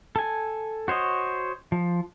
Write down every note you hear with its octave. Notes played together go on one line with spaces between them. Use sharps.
A4 G#5
F#4 C5 C#5 D#5
F3